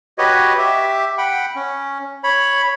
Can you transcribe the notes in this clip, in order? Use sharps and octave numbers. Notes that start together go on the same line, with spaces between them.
F#4 G4 B4 C#5 D#5
G4 E5
F#5 G5 B5
C#4
C#5 B5